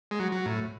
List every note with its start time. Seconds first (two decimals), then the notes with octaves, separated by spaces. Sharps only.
0.11 G#3
0.20 F#3
0.32 F#3
0.46 A2